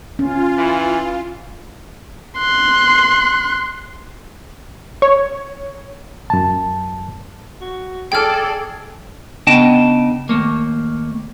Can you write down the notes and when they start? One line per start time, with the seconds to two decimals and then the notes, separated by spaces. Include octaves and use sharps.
0.19 C#4 F4
0.58 E3
2.38 C6 F#6
5.02 C#5
6.30 F#2 A5
7.61 F#4
8.12 G#4 A4 D5 G5 F6
9.47 C#3 B3 D4 D#5 G5 A5
10.29 D#2 B2 A3 A#3